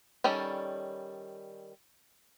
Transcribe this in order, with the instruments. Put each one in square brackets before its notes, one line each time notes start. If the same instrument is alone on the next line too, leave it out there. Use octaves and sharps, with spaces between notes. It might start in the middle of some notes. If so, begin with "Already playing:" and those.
[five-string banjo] D#3 G3 C#4 A4